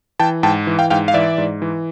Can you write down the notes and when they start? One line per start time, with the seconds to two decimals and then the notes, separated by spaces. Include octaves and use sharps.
0.19 E3 G5 A5
0.43 G#2 G5 A5
0.67 E3
0.79 F5 G5
0.90 G#2 F5 G5
1.08 F5
1.14 E3 D5 E5
1.38 G#2
1.62 E3